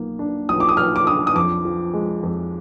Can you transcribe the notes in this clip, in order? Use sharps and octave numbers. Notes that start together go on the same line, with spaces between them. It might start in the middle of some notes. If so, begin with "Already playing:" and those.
Already playing: B1 A#3
D4
B1 D#6
D6
D#6
B1 F6
D6
D4 D#6
D#6
F2 D6
F3
G#3
F2